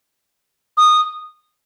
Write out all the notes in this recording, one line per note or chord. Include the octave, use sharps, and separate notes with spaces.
D#6